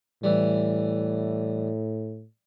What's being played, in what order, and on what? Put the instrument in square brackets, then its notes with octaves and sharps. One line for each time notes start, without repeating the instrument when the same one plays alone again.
[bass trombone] A2 [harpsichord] E3 G3